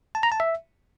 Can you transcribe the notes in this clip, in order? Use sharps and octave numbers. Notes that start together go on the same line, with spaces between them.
A5
A#5
A5
E5